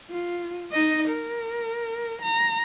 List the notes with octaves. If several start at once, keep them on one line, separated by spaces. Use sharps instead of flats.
F4
D#4 D#5
A#4
A#5